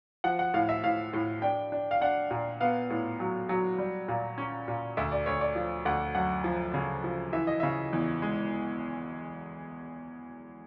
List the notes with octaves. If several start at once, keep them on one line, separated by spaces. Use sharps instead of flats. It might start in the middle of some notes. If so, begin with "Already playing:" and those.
F3 F#5
F#5
A2 F5
E5
A2 F5
A2
D4 G5
D4
F5
D4 F#5
A#2
B3 F5
A2
F#3
F#3
G3
A#2
C#4
A#2
D2 E5
D5
D2 C#5
D5
F3
D2 F#5
F#2 F#5
F3
C#3
F3
E3 E5
D#5
C#3 E5
E2
G#3